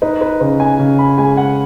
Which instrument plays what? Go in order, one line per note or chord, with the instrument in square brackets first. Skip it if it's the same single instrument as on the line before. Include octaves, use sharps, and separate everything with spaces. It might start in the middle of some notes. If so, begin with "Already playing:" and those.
[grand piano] D#4 [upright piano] B4
[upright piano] B4
[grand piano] C#3 [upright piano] B4
[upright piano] G#5
[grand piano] C#3
[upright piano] B5
[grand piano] G#3 [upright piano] G#5
[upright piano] F#5